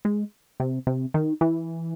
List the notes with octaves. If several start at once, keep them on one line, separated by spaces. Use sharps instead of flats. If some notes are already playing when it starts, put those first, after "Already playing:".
G#3
C3
C3
D#3
E3